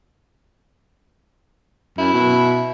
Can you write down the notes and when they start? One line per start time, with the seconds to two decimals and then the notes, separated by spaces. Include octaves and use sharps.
1.98 F#2 E4
2.13 B2